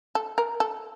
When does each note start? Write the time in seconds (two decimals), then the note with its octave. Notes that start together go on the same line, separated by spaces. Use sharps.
0.15 A4
0.38 A#4
0.60 A4